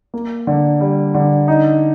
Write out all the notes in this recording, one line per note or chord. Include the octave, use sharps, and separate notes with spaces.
A#3
D3
G3
D3
D#4